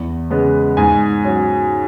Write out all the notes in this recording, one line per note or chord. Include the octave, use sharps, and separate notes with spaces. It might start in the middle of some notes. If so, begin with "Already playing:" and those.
Already playing: E2
C#3 G#3 B3
G#2 G#5
F#3 C#4